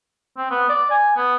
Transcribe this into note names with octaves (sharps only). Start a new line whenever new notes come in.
C4
B3
D5
G#5
B3